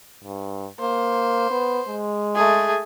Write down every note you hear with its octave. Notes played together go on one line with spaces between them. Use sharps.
G2
A#3 C5
B3
G#3
A3 G#4